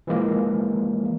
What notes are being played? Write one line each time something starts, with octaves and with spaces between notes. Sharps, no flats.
E3 F3 G#3 A#3